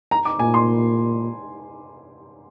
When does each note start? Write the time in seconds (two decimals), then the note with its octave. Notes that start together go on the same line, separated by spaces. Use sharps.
0.11 A#5
0.25 D6
0.39 A#2 G#5
0.54 C6